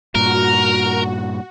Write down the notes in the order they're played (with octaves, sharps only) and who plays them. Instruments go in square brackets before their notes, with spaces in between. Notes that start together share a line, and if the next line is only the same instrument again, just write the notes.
[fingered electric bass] G2 A#2 [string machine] F#4 [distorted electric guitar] A#4